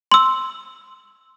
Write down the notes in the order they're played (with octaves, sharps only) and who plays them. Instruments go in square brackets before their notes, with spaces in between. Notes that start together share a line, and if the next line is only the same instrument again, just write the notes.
[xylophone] C6 E6